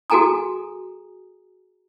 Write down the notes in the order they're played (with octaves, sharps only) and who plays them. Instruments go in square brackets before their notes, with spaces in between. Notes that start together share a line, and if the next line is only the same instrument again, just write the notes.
[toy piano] F#4 G#4 A4 G#5 A#5 D#6